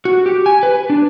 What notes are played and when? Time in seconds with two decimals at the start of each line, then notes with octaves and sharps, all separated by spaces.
0.05 F#4
0.26 G4
0.46 G#5
0.63 B4
0.90 D4